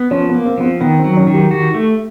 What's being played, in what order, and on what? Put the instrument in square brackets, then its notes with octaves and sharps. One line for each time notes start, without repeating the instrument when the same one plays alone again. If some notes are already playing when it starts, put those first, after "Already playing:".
Already playing: [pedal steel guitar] B3
[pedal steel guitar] F3 [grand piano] C#4
[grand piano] B3
[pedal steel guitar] A#3
[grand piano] C4
[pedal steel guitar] F3 [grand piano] B3
[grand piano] C4
[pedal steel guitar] D#3 [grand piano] B3
[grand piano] C4
[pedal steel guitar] F#3
[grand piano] C#4
[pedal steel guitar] D#3
[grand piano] G4
[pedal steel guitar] F#4 [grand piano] G4
[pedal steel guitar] A3